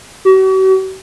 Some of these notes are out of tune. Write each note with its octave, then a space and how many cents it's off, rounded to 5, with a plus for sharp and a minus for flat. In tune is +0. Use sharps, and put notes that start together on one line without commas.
F#4 +45